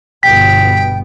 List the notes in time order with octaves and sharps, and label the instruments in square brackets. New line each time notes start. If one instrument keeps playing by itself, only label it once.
[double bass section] G1 B2 B3 [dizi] G5 [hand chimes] B6